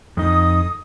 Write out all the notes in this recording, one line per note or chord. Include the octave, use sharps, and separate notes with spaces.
F2 D#4 D#6